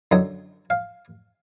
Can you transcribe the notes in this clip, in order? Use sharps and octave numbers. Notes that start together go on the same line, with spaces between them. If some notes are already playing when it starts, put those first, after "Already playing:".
F#2 D3 F#3 D#5
F5